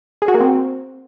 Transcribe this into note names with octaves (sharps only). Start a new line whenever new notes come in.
G#4
F#4
A#3
C4